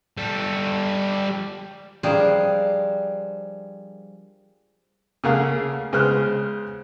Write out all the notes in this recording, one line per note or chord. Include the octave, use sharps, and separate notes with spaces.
G3 A4
F3 G3 D4 G#4 A#4 C5
C#3 A3 A#3 G#4 F5 F#5
C#3 G#3 B3 C5 F6 F#6